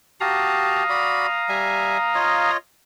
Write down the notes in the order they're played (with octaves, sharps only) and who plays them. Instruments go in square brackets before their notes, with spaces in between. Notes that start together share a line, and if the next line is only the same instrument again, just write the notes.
[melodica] F#4 G4 A5 [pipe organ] F5 A#5 D#6
[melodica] F#4 D5 B5
G3 E5 G#5
F4 C#5 D#5